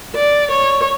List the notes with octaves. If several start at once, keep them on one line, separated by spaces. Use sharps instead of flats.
D5
C#5